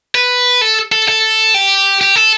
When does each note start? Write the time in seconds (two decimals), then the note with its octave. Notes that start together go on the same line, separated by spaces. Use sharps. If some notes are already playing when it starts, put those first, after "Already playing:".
0.15 B4
0.61 A4
0.92 A4
1.08 A4
1.54 G4
2.01 G4
2.16 A4